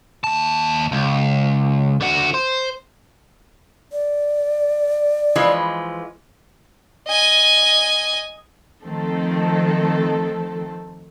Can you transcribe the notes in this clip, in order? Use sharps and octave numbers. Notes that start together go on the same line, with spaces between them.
D#2 A5
C#2
D3 F#4
C5
D5
E3 F3 G#3
D#5 G#5
D#3 F3 A3 C4 A4